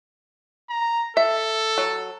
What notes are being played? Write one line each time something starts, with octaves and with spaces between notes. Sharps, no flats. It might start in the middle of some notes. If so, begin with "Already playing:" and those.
A#5
A4 E5
F#3